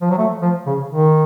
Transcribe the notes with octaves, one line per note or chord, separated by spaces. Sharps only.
F3
F#3
A3
F3
C#3
D#3